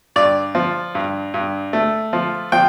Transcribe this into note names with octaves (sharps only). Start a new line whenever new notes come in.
G2 D5
F3
G2
G2
A3
F3
F3 G5